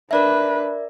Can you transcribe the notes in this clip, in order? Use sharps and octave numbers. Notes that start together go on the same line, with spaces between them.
D4 A#4 B4 D5 E5